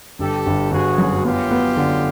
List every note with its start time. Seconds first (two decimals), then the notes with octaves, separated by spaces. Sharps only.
0.19 G1 G4 A4
0.46 G1
0.72 G1 F#4 G#4
0.98 F#2
1.24 B3 F4 G4
1.51 B3
1.77 D3